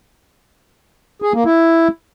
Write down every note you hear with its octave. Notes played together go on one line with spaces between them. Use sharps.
G#4
A#3
E4